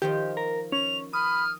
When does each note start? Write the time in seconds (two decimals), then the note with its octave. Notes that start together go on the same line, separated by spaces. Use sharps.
0.02 D#3 F3 G4 C5
0.37 A#4
0.72 C#4 F7
1.13 B5 D#6 F6